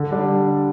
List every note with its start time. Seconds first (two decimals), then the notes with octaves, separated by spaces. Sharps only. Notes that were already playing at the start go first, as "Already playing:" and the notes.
Already playing: D3
0.11 G3 D4